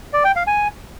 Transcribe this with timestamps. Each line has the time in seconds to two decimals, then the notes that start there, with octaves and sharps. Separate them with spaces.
0.13 D5
0.24 G5
0.36 F5
0.47 G#5